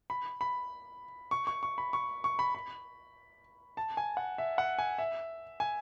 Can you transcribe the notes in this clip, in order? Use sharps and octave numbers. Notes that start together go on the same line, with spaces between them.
B5
B5
C#6
C#6
C#6
B5
C#6
C#6
B5
B5
A5
G#5
F#5
E5
F#5
G#5
E5
G#5